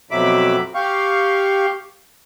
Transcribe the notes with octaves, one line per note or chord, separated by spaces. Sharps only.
F2 B2 F#3 E5 B5 D6
G4 F5 C#6